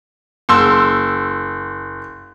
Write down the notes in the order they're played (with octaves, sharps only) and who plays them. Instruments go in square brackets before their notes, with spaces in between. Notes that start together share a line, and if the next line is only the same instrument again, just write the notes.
[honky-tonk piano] F#1 C6 E6